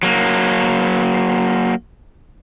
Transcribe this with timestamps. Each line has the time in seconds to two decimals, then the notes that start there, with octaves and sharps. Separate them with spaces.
0.03 F#3 A#3